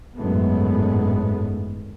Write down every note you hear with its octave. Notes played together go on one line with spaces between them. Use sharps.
G#1 F#2 A2 G#3 A3 B3